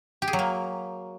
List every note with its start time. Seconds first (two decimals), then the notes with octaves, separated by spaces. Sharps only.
0.22 G4
0.28 G#4
0.33 F#3
0.39 A#3